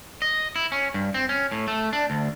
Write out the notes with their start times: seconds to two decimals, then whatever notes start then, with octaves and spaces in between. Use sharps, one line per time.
0.22 D#5
0.56 E4
0.72 C#4
0.94 G2
1.14 C4
1.29 C#4
1.51 A2
1.68 A3
1.93 D4
2.10 D2